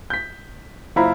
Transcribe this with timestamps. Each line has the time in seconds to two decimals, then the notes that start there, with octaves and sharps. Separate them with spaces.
0.10 G6 B6
0.96 F#1 E4 F4 C5 A#5 B5